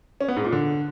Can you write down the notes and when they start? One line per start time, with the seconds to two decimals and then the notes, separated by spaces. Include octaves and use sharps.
0.21 C#4
0.28 B3
0.36 G#2
0.44 A#2
0.52 D3